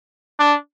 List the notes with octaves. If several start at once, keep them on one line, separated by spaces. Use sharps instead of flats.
D4